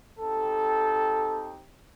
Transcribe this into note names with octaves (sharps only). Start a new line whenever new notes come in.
C4 D#4 G4 A4